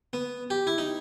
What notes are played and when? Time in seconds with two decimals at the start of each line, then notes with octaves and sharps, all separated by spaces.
0.13 B3
0.50 G4
0.67 E4
0.78 D#4